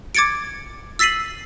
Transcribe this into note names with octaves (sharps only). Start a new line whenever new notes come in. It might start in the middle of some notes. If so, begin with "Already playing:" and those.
D6 G#6 A6 C#7 D7
E6 A6 B6 C7 D#7 F#7